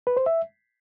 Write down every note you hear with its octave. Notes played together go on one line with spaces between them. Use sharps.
B4
C5
E5